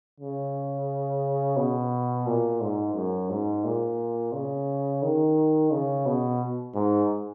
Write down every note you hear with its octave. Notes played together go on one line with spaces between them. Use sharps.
C#3
B2
A#2
G#2
F#2
G#2
A#2
C#3
D#3
C#3
B2
G#2